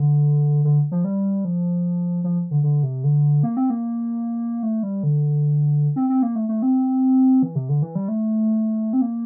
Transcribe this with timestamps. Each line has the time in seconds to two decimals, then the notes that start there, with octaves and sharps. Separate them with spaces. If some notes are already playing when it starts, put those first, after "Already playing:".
Already playing: D3
0.64 D3
0.92 F3
1.04 G3
1.45 F3
2.24 F3
2.51 D3
2.63 D3
2.83 C3
3.04 D3
3.43 A#3
3.57 C4
3.70 A#3
4.63 A3
4.83 G3
5.03 D3
5.96 C4
6.10 C4
6.23 A#3
6.36 A3
6.49 A3
6.62 C4
7.43 E3
7.55 C3
7.69 D3
7.82 E3
7.95 G3
8.08 A3
8.93 C4
9.01 A#3